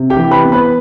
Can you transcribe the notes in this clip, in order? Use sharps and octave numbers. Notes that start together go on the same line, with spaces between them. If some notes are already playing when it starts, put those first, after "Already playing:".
Already playing: C3
G4 G5
E3
B4 B5
B3
B4 B5